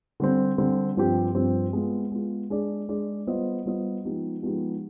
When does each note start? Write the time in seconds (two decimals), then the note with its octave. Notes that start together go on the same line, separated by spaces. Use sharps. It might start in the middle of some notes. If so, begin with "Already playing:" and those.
0.20 D3 G3 C4
0.58 D3 G3 C4
0.97 G2 F3 C4 G4
1.35 G2 F3 C4 G4
1.73 G#3 B3 F4
2.12 G#3 B3 F4
2.50 G#3 D4 G#4 D5
2.89 G#3 D4 G#4 D5
3.27 G3 B3 F4 C5 D#5
3.66 G3 B3 F4 C5 D#5
4.04 F3 G#3 B3 D#4 G4
4.43 F3 G#3 B3 D#4 G4